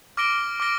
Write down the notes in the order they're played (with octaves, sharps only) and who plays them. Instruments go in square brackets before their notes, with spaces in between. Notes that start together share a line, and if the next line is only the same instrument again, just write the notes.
[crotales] D6 F6 A#6 D7 G7
D6 F6 A#6 D7 G7